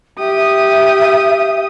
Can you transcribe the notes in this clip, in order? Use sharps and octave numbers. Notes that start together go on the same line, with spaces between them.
G4 E5 D#6